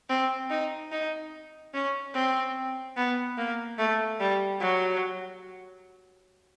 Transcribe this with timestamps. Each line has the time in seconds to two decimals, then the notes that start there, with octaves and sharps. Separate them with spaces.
0.09 C4
0.50 D#4
0.92 D#4
1.74 C#4
2.14 C4
2.97 B3
3.37 A#3
3.78 A3
4.20 G3
4.61 F#3